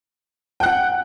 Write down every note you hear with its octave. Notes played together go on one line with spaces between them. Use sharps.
F#5 G5 F#6